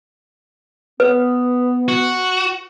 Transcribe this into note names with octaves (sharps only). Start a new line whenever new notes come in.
B3 B4
F#4